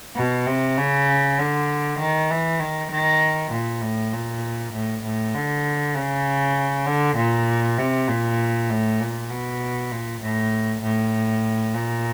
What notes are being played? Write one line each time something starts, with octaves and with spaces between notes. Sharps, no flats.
B2
C3
C#3
D3
D#3
E3
D#3
D#3
A#2
A2
A#2
A2
A2
D3
C#3
D3
A#2
C3
A#2
A2
A#2
B2
A#2
A2
A2
A#2